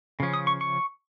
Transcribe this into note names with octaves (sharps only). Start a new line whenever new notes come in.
C#3 F3 C#4
D#6
C#6
C#6